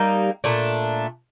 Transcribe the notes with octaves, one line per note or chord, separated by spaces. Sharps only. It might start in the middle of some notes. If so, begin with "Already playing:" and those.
Already playing: G3 A#3 D#4
A#2 A3 D4